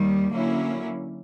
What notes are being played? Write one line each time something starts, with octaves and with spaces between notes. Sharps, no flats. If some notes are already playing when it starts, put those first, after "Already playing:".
Already playing: D#2 D#3 G3
D3 F#3 A#3 C#4 E4